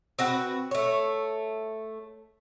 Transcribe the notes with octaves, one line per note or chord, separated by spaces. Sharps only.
C4 F#4 B4
A3 C#5